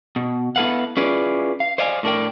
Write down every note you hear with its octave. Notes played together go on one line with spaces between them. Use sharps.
B2
B3 E4 A4 B4 F5 F#5
C#4 E4 F4 G#4 B4 D5
F5
C5 D5 D#5 F5 G5 G#5
A2 D4 A#4 G5